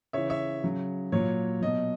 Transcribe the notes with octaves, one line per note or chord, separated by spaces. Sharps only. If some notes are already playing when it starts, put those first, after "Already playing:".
C#3 E3 C#5 E5
C#5 E5
C#3 F#3
A#2 F#3 C#5
B2 F#3 D#5